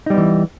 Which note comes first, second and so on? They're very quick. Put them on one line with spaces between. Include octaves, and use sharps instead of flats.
D#4 G3 B3 E3